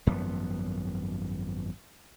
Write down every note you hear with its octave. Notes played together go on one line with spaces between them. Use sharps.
G#1 F#2 F3 B3